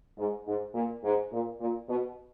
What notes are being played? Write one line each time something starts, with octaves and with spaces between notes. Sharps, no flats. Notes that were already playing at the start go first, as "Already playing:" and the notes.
G#2
G#2
A#2
G#2
A#2
A#2
B2